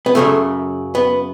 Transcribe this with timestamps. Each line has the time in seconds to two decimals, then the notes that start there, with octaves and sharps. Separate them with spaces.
0.06 B3
0.15 F#2 C#3 F#3 A3
0.95 B3